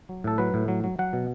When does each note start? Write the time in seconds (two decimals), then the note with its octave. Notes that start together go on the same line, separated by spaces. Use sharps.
0.09 F#3
0.24 A2 A4
0.38 F#3 B4
0.54 A2
0.68 F#3
0.84 F#3
0.99 F#3 F#5
1.13 B2